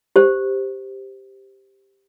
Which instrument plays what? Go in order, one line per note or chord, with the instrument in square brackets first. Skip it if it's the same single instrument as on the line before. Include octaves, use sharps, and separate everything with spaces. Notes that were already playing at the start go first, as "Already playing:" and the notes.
[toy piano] G4 C5